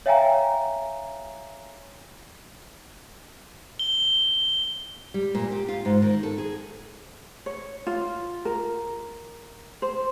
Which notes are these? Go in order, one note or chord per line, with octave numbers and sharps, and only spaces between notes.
C#5 E5 F5 G5 G#5 A#5
G7
G3
A#2
G4
F4
G#2
D#3
A4
G#4
C#5
F4
A#4
C5